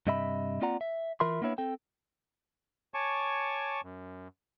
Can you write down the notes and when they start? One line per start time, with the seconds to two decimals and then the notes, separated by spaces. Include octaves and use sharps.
0.07 G2 C3 D#5 E5 B5
0.61 A#3 C4 F4 D5 F#5 A#5
0.81 E5
1.20 E3 F4 A#4 E5 B5 C6
1.42 A#3 B3 D4 E4 C#5
1.58 C4 A4 G5
2.94 C#5 G#5 A5 C#6 D6
3.83 F#2